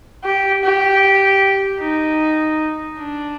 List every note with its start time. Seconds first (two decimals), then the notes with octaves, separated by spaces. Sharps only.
0.24 G4
0.63 G4
1.81 D#4
2.99 D4